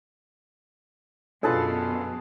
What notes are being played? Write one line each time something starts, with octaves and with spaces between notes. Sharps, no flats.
F#2 B2 D4 F4 G#4 A4 B4 A5